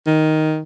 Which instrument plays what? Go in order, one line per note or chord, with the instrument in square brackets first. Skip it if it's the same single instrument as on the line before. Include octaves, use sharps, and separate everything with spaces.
[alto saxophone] D#3